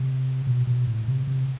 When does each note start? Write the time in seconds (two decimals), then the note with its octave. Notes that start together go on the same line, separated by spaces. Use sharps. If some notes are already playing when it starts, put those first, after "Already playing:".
Already playing: C3
0.47 B2
0.67 B2
0.87 A2
1.08 C3
1.27 C3